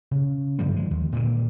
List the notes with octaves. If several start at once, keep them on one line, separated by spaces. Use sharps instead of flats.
C#3
G2 D3 F3 G3
F3 G#3
D#2
A#2 D3 D#3